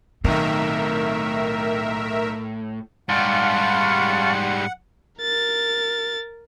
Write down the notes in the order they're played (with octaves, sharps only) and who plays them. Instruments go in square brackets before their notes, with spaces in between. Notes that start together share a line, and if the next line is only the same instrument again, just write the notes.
[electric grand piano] B1 D#3 [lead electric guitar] A2 [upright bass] C4 [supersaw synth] A#4 E5
[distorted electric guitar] G#2 G3 [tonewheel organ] F5 A5 C#6 [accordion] F#5 [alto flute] C6
[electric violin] A#4 A6